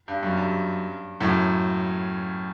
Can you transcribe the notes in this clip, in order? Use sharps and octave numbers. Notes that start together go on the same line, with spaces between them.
G2
F#2
G2
F#2 A2